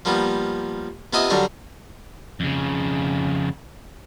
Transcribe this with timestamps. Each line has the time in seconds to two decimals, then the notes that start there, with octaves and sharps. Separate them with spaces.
0.05 F3 G3 A#3 B3
1.13 C3 B3 F4 D#5 E5 G#5
1.30 D3 F#3 G3 D4 A#4
2.40 F2 C#3